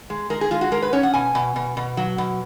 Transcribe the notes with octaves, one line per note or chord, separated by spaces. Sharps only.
G#3
G#3 A#4
G#4
G#3 F4
F#4
G#3 A#4
B4
C#4 C#5
F#5
B2 G#5
B2
B2
B2
F#3
B2